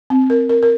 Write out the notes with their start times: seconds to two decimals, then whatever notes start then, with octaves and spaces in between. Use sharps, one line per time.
0.10 C4
0.30 A#4
0.49 A#4
0.63 A#4